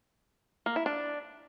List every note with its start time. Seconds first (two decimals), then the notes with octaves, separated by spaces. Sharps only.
0.66 A#3
0.76 E4
0.86 D4